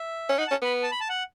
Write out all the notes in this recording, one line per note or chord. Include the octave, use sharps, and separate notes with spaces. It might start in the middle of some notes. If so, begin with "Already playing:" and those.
Already playing: E5
C#4
D#4 F#5
A5
C#4
B3 B5
A5
B5
A5
F#5